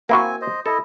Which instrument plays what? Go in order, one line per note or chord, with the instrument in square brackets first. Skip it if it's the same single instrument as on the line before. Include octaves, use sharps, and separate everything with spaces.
[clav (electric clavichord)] A#3 E4 F#4 [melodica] C4 G#5
[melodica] C5 D#5
[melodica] E4 D#5 [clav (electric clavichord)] A4